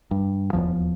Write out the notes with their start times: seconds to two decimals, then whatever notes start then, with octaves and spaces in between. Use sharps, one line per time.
0.11 G2
0.53 D#1 A#1 E2 F3